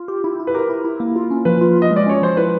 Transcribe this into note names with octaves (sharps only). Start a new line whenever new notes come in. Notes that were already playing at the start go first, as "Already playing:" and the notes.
Already playing: F4
G4
E4
E4
B4
G4 A#4
E4
E4
A#3
F4
C#4
F3 B4
F4
F4
D#5
G#3
D5
C#4 C#5
F3 C5
E4 B4